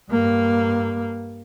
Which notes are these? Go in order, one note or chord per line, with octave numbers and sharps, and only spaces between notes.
G2 A#3